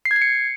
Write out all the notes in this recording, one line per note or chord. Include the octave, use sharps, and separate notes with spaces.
C7
G#6
C7
C#7